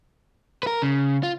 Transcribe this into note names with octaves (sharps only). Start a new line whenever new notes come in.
A#4 B4
C#3
F4